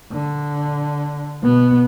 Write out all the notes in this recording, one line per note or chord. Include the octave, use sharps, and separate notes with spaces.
D3
B2 B3